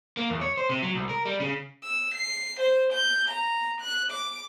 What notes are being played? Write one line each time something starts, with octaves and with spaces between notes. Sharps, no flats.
A#3
E2
C#5
C5
C3
F#3
C2
A#4
G3
C#3
E6
C7
C5
G6
A#5
F#6
D6